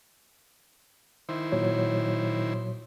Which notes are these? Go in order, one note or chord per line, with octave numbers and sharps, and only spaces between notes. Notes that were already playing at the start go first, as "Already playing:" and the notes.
D#3 E4 C5
A#2 F#3 C#5